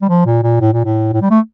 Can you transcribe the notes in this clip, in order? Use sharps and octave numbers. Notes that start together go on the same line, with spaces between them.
G3
F3
A#2
A#2
A2
A#2
A2
A2
G3
A3